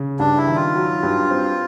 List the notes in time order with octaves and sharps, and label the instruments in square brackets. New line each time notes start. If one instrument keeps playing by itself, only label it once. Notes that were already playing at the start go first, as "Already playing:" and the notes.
Already playing: [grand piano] C#3
[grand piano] G2 [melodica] D4
[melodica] E4
[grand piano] D#3
[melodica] F4
[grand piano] F#3
G2
C4